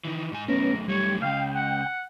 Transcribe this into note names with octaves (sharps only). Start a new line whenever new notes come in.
D#3 E3
G#2 G#5
F#2 A3 B3 C#4 A#4
F#2 G3 A3 C#5
C#2 C#3 F5 G5
F#5